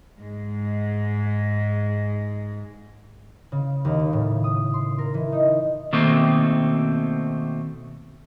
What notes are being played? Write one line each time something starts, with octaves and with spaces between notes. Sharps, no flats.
G#2 G#3
C#3
D#2
C#3
A2
D#6
C6
A#4
E3
D#4
B2 D#3 A3 A#3 C4